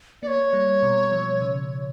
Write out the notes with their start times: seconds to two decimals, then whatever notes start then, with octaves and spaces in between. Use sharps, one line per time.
0.23 A#3 C#5 D5
0.53 G3
0.83 B2
1.12 F3
1.41 C#3